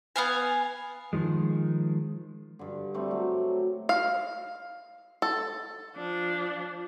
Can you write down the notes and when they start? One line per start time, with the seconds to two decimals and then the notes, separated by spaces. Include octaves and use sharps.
0.16 B3 F5 G#5
1.13 D#3 F3 G#3
2.59 G2 D3
2.94 G3 A3 C4
3.11 F#3
3.89 F5
5.22 A4
5.96 F3 D4